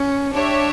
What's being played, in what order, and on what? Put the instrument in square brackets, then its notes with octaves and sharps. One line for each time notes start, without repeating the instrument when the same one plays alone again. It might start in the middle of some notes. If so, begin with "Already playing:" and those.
Already playing: [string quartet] C#4
[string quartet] D4 [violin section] G4 C#5 E5